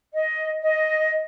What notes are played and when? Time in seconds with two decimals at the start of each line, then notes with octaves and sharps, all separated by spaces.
0.13 D#5
0.63 D#5